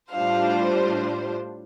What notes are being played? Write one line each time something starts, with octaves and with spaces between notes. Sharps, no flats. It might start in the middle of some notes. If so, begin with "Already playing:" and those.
A2 G3 D4 F4 C5 F5